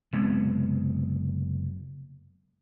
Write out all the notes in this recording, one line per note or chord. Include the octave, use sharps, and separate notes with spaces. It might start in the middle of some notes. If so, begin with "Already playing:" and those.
F#1 C3 G#3 B3